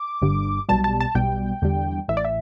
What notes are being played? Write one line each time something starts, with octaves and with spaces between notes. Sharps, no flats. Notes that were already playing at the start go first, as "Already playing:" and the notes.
Already playing: D6
G1 G2 D3
B1 B2 G3 A5
A5
A5
B1 B2 G3 G5
E2 D3 G3
A1 A2 E3 E5
D5
E5